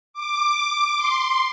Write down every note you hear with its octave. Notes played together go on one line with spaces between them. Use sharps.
D6
C6